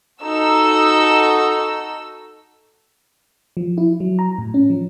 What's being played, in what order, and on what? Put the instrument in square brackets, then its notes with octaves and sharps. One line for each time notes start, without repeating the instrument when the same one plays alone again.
[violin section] D#4 F#4 A4 E6
[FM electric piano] F3
E4
F#3
A#5
A2
C#4
F3